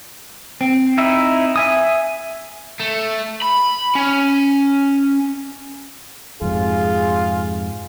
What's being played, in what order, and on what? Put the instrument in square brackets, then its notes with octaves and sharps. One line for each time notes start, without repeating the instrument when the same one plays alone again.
[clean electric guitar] C4
[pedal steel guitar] D#4 E4 E5
E5 G#5 D#6
[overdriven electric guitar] A3
B5
C#4
[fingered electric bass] F2 G#2 C3 [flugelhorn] F4 [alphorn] G#4